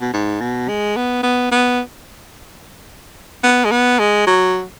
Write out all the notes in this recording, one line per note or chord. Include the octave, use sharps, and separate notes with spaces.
B2
G#2
B2
G#3
B3
B3
B3
B3
G#3
B3
G#3
F#3